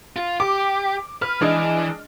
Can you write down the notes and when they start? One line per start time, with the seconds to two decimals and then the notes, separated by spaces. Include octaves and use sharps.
0.16 F4
0.40 G4 D6
1.22 B4 F6
1.41 E3 G#3 D4 D#5